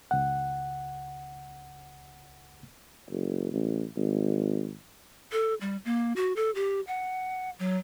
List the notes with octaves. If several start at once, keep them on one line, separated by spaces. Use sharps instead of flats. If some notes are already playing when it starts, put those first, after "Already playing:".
C#2 F#5
F#1
A1
G#1
A4
G3
A#3
F#4
A4
G4
F#5
F#3